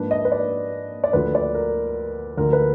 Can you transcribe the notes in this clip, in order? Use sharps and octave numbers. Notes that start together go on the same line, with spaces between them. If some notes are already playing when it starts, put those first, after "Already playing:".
Already playing: G#2 F3 A#3 D4 B4
D#5
B4
D5
D5
D2 D3 F3 B4
D5
A#4
D2 D3 F3 A#4
B4